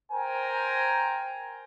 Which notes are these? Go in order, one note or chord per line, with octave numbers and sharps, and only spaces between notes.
A#4 C5 G5 G#5 A#5